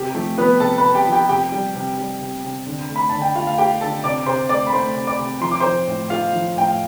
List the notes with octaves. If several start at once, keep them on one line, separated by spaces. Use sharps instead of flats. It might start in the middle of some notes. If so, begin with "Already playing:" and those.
Already playing: C3 G4
F3 A3 A4
F3 B3 B4
C3 A4 A5
B4 B5
C3
G4 G5
F3
G4 G5
C3 G4 G5
G3
C3
G3
C3
C3
D3
A3
B5
D3 A5
G5
A3 F4 F5
F5
A3 G4 G5
D3 A4 A5
C3 D5 D6
C3 C5 C6
A3 D5 D6
B5
A3 C5 C6
C3
D5 D6
C3
F3 C6
D6
F3 C5 C6
A2
A3 F4 F5
F3
A2 G5
F5